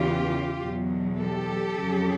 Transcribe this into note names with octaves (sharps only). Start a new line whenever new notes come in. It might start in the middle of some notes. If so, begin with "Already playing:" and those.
Already playing: E2 C#3 E3 F4 G4
E2 B2 F#3
G4 A4
F2 C#3 F#3